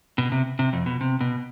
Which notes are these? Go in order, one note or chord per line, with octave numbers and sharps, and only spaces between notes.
B2
C3
C3
F2
B2
C3
B2